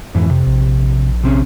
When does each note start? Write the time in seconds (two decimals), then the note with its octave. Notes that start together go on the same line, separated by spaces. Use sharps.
0.15 F2 G#2 E3
0.30 C3
0.46 A#1
1.23 C3 C4 C#4